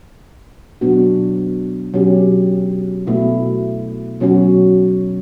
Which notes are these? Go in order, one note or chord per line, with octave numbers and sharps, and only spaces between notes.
B2 F#3 B3 D4 F#4
B2 F#3 C#4 G4
B2 A3 E4
B2 F#3 C#4 F#4